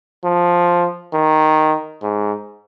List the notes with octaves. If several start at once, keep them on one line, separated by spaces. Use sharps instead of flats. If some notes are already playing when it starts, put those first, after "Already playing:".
F3
D#3
G#2